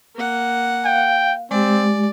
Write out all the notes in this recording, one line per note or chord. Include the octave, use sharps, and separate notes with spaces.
A#3 F#5
F5 G5
G#3 C4 G4 D5